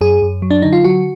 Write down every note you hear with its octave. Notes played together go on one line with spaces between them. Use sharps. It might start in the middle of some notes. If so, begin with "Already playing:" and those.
F#2 G#4
F#2
F#3
D4
D3 D#4
F4
F#3 F#4